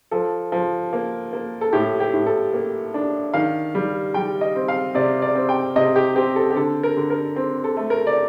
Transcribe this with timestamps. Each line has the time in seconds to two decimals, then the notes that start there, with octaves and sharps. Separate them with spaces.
0.11 F3 A4
0.52 F3
0.93 A#3
1.33 A#3
1.61 A4
1.73 A2 G4
2.00 G4
2.14 A2
2.26 A4
2.53 A#3
2.94 D4
3.34 D#3 F5
3.75 G3
4.14 G3 G5
4.41 D#5
4.55 C4
4.68 F5
4.95 C3 D5
5.22 D5
5.35 C4
5.49 G5
5.76 C3 D#5
5.96 G4
6.16 C4 G4
6.36 A4
6.50 G4
6.56 D3 A4
6.83 A#4
6.97 D3
7.10 A#4
7.36 C4
7.64 A4
7.77 A3
7.90 A#4
8.07 D5